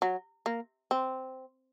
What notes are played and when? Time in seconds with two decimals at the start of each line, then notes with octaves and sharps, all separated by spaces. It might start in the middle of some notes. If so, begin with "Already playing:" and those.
0.02 F#3
0.46 A#3
0.91 C4